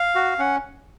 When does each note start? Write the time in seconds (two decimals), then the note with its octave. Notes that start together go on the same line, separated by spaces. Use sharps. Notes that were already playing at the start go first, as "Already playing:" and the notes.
Already playing: F5
0.15 F#4
0.39 C#4 F#5